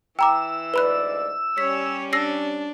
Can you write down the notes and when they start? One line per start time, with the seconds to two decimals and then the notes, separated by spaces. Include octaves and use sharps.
0.19 E3 G5 A#5 D6 E6
0.74 D2 G#2 B4 D5 B5 F#6
1.58 G3 C#4 C#5 B6
2.13 D4 E6 A#6 C7